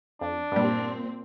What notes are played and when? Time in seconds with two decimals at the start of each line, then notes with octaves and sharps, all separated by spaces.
0.21 F2 D4
0.52 G2 A#2 G3 C4